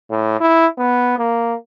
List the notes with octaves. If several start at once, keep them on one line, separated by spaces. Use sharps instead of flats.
A2
E4
B3
A#3